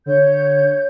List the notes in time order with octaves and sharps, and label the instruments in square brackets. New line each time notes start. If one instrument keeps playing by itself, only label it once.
[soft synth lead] D3 [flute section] C#5 G6